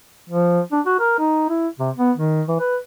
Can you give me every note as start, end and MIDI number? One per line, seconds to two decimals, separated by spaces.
0.30 0.60 53
0.72 0.81 62
0.86 0.95 66
1.00 1.18 70
1.19 1.45 63
1.50 1.68 64
1.79 1.90 48
1.97 2.12 59
2.17 2.42 51
2.48 2.55 52
2.59 2.77 71